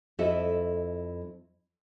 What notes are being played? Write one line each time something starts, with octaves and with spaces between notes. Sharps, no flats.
F2 E4 A4 D#5 E5